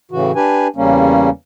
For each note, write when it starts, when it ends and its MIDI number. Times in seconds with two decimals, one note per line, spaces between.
0.12 0.32 45
0.12 0.32 49
0.12 0.32 52
0.12 0.32 66
0.35 0.67 62
0.35 0.67 67
0.35 0.67 71
0.35 0.67 80
0.76 1.30 40
0.76 1.30 49
0.76 1.30 55
0.76 1.30 58
0.76 1.30 61